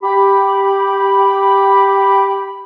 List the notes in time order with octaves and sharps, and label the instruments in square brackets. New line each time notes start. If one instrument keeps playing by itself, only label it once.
[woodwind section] G4 B5